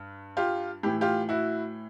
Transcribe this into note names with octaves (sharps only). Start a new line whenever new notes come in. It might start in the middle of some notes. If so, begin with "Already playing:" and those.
Already playing: G2
F4 G4
A2 E3 G4
F4 G4
E4 F#4